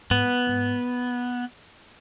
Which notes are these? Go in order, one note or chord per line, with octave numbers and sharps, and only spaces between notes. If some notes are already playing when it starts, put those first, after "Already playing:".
G#2 B3
G#2